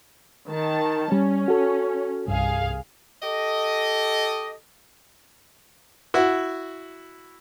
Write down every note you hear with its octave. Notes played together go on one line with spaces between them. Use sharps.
D#3 A5
G3 C#4
F#4 A4
C2 G2 G#4 F5
G4 A4 D#5
E4 F#4